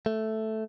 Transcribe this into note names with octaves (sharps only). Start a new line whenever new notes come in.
A3